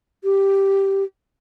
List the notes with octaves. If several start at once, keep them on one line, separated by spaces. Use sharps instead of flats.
G4